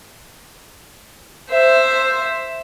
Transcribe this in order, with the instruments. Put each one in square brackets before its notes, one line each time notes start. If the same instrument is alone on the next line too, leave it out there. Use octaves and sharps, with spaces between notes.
[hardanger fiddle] C5 E5